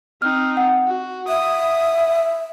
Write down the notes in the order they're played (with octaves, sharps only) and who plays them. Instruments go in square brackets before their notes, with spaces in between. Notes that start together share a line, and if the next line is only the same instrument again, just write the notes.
[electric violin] C4 D#4 [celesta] F6
[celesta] F#5
[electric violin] F#4
[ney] E5 [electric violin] D#6